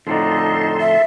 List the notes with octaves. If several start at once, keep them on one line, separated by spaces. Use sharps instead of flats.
F2 A2 D3 D#4 A4 A5 C6
E5